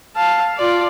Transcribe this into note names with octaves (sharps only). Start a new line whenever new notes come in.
F5 A5
F4 D5